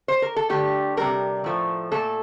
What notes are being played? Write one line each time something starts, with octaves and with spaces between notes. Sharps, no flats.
C5
A#4
A4
D3 A3 G4
C3 G3 A#4
A2 F3 A3
A#2 A3 A4